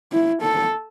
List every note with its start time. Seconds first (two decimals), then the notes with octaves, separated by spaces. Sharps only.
0.12 E4
0.42 A4